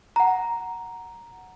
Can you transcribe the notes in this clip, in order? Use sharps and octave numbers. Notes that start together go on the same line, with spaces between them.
F#5 A#5